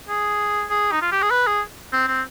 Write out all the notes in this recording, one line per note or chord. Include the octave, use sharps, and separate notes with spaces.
G#4
G#4
D#4
F4
G4
G#4
B4
G#4
C4
C4